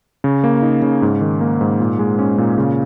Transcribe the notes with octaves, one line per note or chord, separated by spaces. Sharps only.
C#3
A#3
D#4
C#3
G#2
D#3
A#3
G#2
A#2
G#3
C#4
A#2
C#3